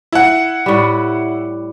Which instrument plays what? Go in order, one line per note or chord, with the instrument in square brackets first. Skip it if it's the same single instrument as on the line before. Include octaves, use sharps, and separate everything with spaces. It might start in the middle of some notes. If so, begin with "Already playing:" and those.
[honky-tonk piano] E4 F#5
[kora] A2 G3